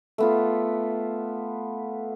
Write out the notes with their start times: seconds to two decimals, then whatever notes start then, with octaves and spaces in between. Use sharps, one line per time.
0.18 A3 B3 F4